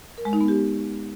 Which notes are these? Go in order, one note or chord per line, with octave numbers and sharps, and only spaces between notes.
A#4
G#3
D#4
B3
G4